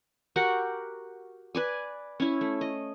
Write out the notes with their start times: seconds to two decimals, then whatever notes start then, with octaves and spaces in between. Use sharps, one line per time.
0.36 F#4 G4 A#4 F#5
1.55 B4 D5 G#5
2.20 C#4 E4
2.41 A3
2.61 D#5